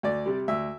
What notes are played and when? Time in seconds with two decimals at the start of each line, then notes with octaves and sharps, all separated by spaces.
0.03 D2 D5
0.26 C3 G3
0.48 D2 E5